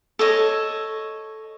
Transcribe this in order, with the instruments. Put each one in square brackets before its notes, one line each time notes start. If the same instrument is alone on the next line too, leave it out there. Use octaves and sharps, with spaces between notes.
[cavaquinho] A4 C#5 D#5